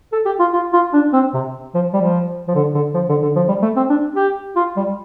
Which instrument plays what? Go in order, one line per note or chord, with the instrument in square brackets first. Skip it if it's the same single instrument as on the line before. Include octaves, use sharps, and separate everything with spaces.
[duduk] A4
G4
F4
F4
F4
D4
C4
C3
F3
G3
F3
F3
D3
D3
F3
D3
D3
F3
G3
A3
C4
D4
G4
F4
G3